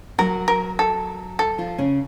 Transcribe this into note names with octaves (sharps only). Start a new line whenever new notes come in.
F#3 F#4 A#4
A#4
A4
A4
F3 F4
C#3 C#4